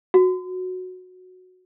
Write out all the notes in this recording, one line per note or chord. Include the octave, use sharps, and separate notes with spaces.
F#4